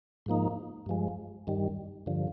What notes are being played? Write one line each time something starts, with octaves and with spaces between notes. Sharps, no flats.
G#2 F3 A#3 D#4
G2 F3 G#3
G2 D#3 G3
G2 D3 F3